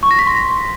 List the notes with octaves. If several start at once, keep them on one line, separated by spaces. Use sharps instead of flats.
C#6
A#6
B6
C6